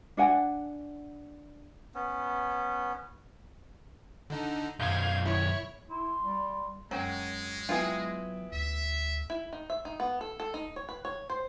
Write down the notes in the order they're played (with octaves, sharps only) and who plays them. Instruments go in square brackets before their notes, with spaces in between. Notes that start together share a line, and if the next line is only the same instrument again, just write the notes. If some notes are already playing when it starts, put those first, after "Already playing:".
[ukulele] D4 F#5 G#5
[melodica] B3 C#4
[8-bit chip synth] D3 D#4
[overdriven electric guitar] B1 F#2 [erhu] F5 [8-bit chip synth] G6 G#6
[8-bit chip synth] E4 [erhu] C#5
[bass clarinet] E4 [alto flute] C6
[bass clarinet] G3
[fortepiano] F#2 G5 [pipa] F#3 [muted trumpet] G#3
[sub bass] F#3 [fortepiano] B3 E4 G5 [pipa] F4 G#4
[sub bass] D2 [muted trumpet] E5
[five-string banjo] E4
D#4
E5
D#4
B3
A4
A4
D#4
C#5
B4
C#5
C5